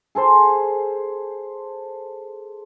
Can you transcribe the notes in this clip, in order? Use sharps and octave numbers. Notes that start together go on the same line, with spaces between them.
G#4 A4 C5 C6